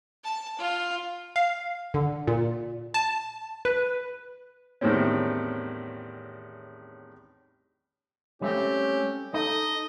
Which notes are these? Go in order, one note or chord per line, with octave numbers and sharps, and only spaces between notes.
A5
F4
F5
D3
A#2
A5
B4
E2 A2 D#3 G3 C4 C#4
G3 A3 C4 C#4 G4
D#4 A4 D#5